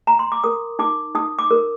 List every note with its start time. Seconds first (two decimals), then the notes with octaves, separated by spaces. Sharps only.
0.07 A#5
0.19 C6
0.32 D6
0.44 A#4 D#6
0.79 D#4 D6
1.15 D#4 D#6
1.39 D6
1.51 A#4